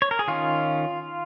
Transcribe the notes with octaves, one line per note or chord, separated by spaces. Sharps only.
C#5
A#4
G#4
D#3 C#4 F4